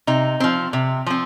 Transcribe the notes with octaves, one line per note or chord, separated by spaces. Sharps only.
C3 D#4
F3 C4
C3
F3 C4